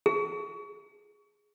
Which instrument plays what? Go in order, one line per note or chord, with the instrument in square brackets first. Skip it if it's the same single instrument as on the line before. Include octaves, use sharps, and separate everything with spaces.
[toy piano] G#4